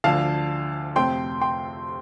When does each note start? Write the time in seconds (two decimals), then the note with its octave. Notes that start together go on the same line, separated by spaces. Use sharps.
0.04 D2 D3 F3 F5 A5
0.96 F2 C3 A3 C4 G5 C6
1.41 G5 C6